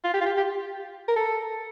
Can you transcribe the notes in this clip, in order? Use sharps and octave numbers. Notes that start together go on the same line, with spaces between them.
F4
G4
F4
G4
G4
A#4
A4